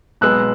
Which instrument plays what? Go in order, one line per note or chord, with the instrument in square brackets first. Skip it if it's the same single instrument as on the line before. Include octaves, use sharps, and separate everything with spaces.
[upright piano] B1 B2 G#3 B3 E6 F#6